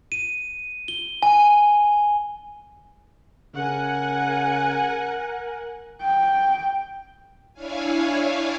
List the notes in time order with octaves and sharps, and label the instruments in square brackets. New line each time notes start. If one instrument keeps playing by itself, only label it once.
[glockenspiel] D#7
G7
G#5
[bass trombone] C#3 [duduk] A#4 [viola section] F#5 G#5
[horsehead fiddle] G5
[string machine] D4 E4 C#5 F5 G#5